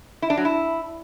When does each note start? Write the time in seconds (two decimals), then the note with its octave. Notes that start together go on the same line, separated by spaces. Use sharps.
0.22 E4
0.30 D4
0.37 F#3
0.45 E4